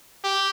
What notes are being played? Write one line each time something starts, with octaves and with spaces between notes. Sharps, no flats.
G4